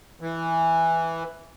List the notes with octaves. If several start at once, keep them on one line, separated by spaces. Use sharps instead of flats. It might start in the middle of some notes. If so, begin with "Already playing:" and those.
E3